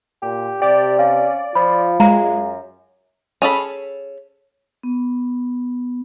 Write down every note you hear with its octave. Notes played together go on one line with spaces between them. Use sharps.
A#2 G4
C3 G4 D5
C#4 F5
F3 F4 B5
F#2 G#3 F5 A#5
C#4 G#4 A4 B5
B3